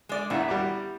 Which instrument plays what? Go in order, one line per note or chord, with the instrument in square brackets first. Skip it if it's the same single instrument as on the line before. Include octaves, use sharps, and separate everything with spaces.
[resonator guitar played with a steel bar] G#3 D5
[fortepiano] A#1 F#5 [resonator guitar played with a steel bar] B3 E4
[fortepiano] G3 F#4 D6